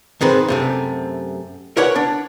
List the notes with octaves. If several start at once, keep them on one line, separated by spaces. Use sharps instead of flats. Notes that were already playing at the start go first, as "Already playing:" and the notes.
G#2 D#3 C4 B4
F#2 C3 A3
A#4 B4 C#5 D5 F#5 G#5
D4